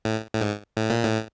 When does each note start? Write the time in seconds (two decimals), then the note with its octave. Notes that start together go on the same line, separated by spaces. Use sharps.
0.05 A2
0.33 A2
0.41 G#2
0.77 A2
0.90 A#2
1.03 A2